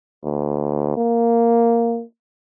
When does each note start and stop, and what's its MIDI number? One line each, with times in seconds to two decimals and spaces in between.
0.24 0.95 38
0.97 2.03 58